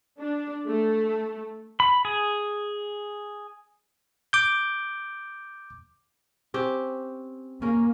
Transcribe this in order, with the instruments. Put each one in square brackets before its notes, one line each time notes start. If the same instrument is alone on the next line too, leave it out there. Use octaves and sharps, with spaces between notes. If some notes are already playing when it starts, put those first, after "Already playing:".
[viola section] D4
A3
[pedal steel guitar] B5
G#4
[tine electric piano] D6 G6
[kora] C4 C#4 G4
[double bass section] A#3 [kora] C#4 A#4